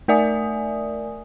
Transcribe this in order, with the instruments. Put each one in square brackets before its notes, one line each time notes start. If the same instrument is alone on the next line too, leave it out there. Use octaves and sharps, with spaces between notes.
[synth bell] A3 A#4 D5 E5 G#5 D#6